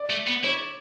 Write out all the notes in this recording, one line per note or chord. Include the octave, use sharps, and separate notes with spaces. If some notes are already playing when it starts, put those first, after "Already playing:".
Already playing: D5
A3
B3
E4 C#5